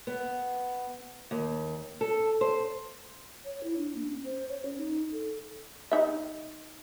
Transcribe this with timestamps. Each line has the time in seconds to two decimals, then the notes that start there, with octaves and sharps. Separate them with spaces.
0.07 B3
1.31 D#2
2.01 A4
2.41 C5
3.45 C#5
3.64 E4
3.78 D4
3.95 A#3
4.06 C#4
4.24 C5
4.50 C#5
4.65 C#4
4.77 D#4
5.12 A4
5.91 D#4 E5